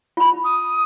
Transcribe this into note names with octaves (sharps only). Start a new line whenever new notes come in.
F4 B5
D#6